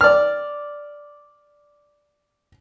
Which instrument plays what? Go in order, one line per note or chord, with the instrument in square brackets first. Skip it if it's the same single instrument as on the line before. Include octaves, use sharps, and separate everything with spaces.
[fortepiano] D5 F6